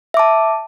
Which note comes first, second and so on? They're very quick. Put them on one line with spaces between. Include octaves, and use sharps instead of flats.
E5 D6 A5